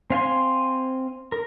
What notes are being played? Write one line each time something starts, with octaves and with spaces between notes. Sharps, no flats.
C4 F5 G#5 C6
A#4